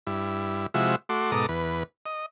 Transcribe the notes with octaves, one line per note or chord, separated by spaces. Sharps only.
G2 E4
C3 F3 G#3 E4 F#4 E5
A3 F#4 C6 D6
G#2 B2 A4 A#5 D6 D#6
E2 B4
D#5